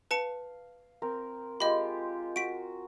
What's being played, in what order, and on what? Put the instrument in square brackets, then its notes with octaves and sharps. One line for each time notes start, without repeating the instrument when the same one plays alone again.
[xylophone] B4 A5 C#7 [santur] F5
[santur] C4 A#4
[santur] G#3 F4 G4 [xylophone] D#5 B5
[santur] F#4 [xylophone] B6 D7